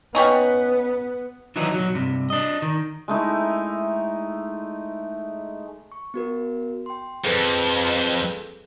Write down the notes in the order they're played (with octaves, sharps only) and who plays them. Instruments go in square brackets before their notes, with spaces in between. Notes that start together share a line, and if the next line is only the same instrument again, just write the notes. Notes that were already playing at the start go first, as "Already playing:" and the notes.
[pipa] G3 C#4 D#4 [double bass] B3
[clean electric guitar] D#3 E3 F#3 D4 D#4
B1 F#3
G2 C3
D4 D#5
D#3
[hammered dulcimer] G#3 A3 D#4 E4
[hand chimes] C#6
B3 F#4 A#4
G5 C6
[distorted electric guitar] F2 [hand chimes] G#4 A4 B4